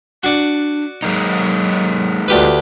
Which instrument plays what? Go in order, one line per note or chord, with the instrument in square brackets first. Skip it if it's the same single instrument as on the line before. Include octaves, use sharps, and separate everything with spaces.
[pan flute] D4 [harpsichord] F#4 D5 F#5
[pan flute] F#3 [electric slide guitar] G#3 A#3 D#4
[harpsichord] D2 G4 B4 [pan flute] F4